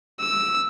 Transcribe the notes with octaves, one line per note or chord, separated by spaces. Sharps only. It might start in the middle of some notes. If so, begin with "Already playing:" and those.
E6